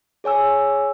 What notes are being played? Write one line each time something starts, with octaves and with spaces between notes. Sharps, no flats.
G#4 C#5 G#5 E6